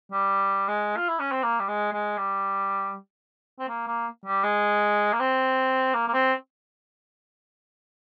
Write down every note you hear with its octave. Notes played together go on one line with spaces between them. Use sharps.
G3
G#3
F4
E4
C#4
C4
A#3
G3
G#3
G#3
G3
C4
A#3
A#3
G3
G#3
A#3
C4
A#3
A#3
C4